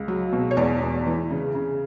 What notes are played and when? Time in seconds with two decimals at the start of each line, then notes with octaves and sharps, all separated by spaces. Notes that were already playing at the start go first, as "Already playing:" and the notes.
Already playing: C#2
0.08 F#3
0.33 B2
0.51 C#5
0.57 E2 D5
0.81 E2
1.06 E3
1.30 C#3
1.55 C#3